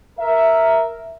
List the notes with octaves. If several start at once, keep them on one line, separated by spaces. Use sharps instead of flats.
A#4 E5